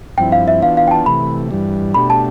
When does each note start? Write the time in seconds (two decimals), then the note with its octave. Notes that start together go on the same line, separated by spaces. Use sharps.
0.18 G2 F3 C4 E4 G5
0.32 F5
0.48 E5
0.62 E3 B3 D4 F4 F5
0.77 F5
0.87 G5
0.91 A5
1.06 C3 E3 A3 B5
1.51 G2 E3 G3
1.94 B2 A3 D4 G4 B5
2.10 A5